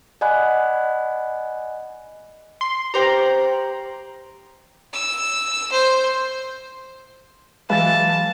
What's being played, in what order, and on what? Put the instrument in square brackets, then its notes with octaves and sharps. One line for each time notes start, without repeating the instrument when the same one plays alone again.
[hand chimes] D5 D#5 F#5 G#5 B5 F#6
[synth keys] C6
[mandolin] C#4 C5 D5 [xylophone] G4 G5 A#6 [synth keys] A#5
[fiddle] E6
C5
[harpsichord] E3 [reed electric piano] F#3 G#3 B4 [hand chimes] F5 A6 [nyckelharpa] A5